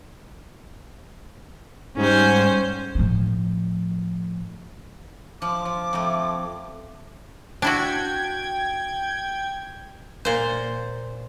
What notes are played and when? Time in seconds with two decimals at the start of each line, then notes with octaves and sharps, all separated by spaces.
1.97 G#2 G3 C#4 C5
2.95 A2 F3
5.42 F3 D6
5.65 F3
5.93 F2 A3
7.62 D4 E4 F#4 G5 G#6
10.25 A#2 C5